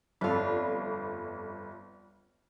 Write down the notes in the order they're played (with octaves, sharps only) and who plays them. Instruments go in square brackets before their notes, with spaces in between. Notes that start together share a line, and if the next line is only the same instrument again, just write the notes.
[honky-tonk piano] G1 F2 [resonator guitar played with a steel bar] D4 F4 [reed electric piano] A4 B5